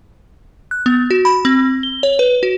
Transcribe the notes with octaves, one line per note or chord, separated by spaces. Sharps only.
F#6
B3
F#4
B5
C4
G7
C#5
B4
F#4